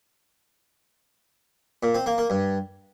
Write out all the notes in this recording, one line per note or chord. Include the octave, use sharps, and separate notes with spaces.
A#2
C4
A#3
A#3
G2